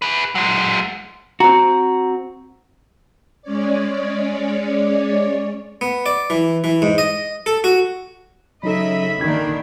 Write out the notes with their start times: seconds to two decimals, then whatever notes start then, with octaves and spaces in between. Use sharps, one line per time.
0.02 G#4 B4
0.35 F#3 G#3
1.40 C4 F#4 A#5
3.42 G#3 C#4 C#5 D5
5.81 B3
6.06 D5
6.30 E3
6.64 E3
6.82 G#2
6.98 D#5
7.46 A4
7.64 F#4
8.63 C#3 F#3 D#4 A4 D#5 E5 B5
9.21 D3 D#3 A#3 D4 G#6